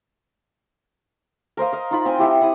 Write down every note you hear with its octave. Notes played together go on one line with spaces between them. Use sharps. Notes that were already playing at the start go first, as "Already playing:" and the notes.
A#4 C5 D#5 F5
D#5 F5
D#4 F4 B5
C4 G5 G#5
E4 G4 E5 F#5
E4 F#5 D#6